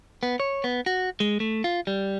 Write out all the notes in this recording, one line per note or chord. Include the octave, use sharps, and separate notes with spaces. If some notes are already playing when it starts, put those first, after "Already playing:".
B3
C#5
B3
F#4
G#3
A3
F4
G3